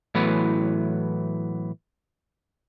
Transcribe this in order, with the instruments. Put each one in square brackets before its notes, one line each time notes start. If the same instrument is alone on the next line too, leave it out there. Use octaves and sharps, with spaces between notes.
[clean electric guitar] A2 E3 F#3 B3